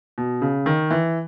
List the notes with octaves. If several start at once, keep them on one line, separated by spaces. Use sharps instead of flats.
B2
C#3
D#3
E3